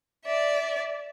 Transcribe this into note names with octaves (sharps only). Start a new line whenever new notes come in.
D5 E5